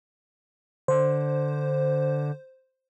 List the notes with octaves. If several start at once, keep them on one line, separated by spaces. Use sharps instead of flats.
D3 C5